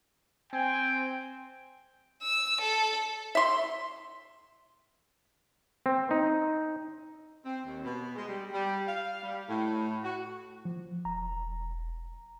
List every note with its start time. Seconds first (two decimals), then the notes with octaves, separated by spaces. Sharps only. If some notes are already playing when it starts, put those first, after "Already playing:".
0.53 C4 G5 G#5
2.22 E6
2.61 A4
3.35 E5 C6
5.86 C4
6.11 D#4
7.45 C4
7.65 D#2
7.84 B2
8.15 G#3
8.28 G3
8.52 G3
8.87 F5
9.23 G3
9.48 A2
10.04 F#4
10.65 F3
11.05 E1 A#5